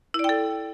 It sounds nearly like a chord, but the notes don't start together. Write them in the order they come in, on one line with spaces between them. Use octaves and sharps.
E4 D5 G5 A4